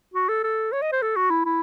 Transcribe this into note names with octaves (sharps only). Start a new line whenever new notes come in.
F#4
A4
A4
C#5
D#5
C5
A4
F#4
E4
E4